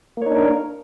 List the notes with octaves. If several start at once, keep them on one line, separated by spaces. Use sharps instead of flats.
A#3 D4 D#4 A#4 C#5